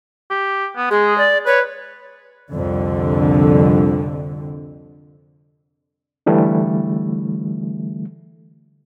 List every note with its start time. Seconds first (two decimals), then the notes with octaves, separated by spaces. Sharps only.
0.30 G4
0.77 B3
0.91 G#3 G#4
1.18 D5
1.46 B4 C#5
2.52 C2 F2 D3
6.26 D3 E3 G3 A3